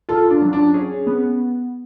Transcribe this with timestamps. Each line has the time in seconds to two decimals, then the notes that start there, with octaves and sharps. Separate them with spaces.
0.09 F4 A4
0.30 D4
0.42 F#3
0.53 D4
0.74 C#4 G#4
1.07 B3